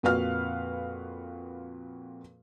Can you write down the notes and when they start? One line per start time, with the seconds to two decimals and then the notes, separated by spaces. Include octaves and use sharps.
0.03 F2 A#2 F#4 B4 F5 F6